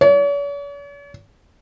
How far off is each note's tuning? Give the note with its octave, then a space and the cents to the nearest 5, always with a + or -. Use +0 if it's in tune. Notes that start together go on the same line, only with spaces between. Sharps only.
C#5 +45